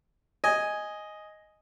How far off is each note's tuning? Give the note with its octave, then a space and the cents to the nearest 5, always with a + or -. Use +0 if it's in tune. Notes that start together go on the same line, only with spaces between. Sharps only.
D#5 +0 G#5 +0